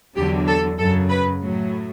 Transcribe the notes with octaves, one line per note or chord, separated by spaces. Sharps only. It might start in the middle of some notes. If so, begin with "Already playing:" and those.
E2 D3 F#3 G4
A4
F#2 C#3 F#3 A4
B4
A2 F#3